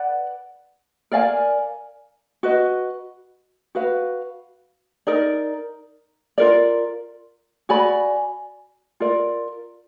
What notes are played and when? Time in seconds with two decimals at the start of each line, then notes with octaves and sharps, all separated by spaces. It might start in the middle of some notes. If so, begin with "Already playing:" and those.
Already playing: B4 D5 F#5
1.11 A#4 D5 F5 G#5
2.43 F#4 B4 D#5
3.75 F#4 B4 F5
5.07 D#4 A#4 D5
6.38 F4 A#4 D5
7.69 F#4 D5 G#5 B5
9.00 F4 A#4 D5